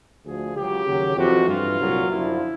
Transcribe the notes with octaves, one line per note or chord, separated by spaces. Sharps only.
D2 D3 F3 G#4
C#2 C#3 F#3 G4
D#2 C#3 F#3
F2 C3 E3 F#4
G2 E3 F4
C2 A#2 F#3
F#2 D3 F3 E4